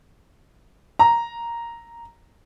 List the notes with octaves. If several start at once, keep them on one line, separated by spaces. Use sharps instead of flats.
A#5